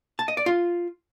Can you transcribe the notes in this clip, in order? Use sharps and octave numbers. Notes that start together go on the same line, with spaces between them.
A5
D#5
D5
F4